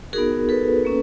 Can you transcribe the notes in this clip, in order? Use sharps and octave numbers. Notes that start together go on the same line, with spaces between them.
B3 D#4 F#4 G#4 A#4
A4 B4
A#3 C#4